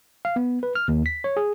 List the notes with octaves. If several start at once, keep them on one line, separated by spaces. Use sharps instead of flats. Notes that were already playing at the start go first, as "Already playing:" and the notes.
F5
B3
B4
F6
D#2
B6
C#5
G#4